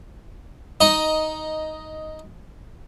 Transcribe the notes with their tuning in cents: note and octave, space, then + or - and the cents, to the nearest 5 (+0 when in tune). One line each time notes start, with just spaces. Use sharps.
D#4 +5 D#5 +0